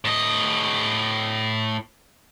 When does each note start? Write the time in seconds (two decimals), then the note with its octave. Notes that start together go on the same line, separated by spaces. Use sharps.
0.05 A2 D#5